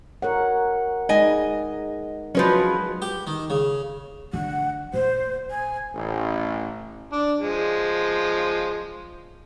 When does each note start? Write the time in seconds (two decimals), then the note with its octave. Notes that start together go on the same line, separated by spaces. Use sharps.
0.22 A#4 C#5 F#5
1.09 G#3 D#4 D#5 G#5
2.35 F3 F#3 G#3 C#4 B4
3.02 G4
3.27 D#3
3.50 C#3
4.33 D3 F#5
4.94 A#2 C5
5.51 G#5
5.94 A1
7.12 D4
7.41 F3 G#3